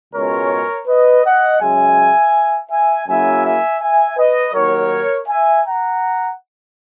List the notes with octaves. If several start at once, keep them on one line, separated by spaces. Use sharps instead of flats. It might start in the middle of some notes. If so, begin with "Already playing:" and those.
C#2 B2 G#3 C#4 A#4 C#5
B4 D#5
D#5 F#5
F#2 C#3 G#3 E5 G#5
E5 G#5
F#2 C#3 F#3 A#3 E4 E5 G#5
E5 G#5
E5 G#5
B4 D#5
D#2 D#3 F#3 A#4 C#5
E5 G#5
F#5 A#5